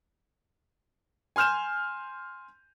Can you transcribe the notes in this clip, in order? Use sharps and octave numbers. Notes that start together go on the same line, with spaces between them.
G#5 C6 F6 G6 E7